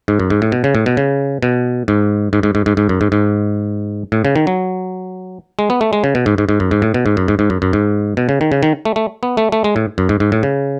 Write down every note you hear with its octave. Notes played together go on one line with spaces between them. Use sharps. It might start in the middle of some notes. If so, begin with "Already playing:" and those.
G#2
F#2
G#2
A2
B2
C#3
A2
B2
C#3
B2
G#2
G#2
G#2
G#2
G#2
G#2
F#2
G#2
G#2
A2
C#3
D#3
F#3
G#3
B3
A3
G#3
C#3
B2
G#2
G#2
G#2
F#2
G#2
A2
B2
G#2
F#2
G#2
G#2
F#2
F#2
G#2
B2
C#3
D#3
C#3
D#3
A3
A3
B3
A3
A3
G#3
A2
F#2
G#2
G#2
A2
C#3